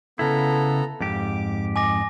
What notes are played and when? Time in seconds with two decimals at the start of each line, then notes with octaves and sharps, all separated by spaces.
0.19 C#3 B3 E4 A4 A#5
1.00 F2 G#2 G4 D6
1.76 D#5 G#5 D6 A#6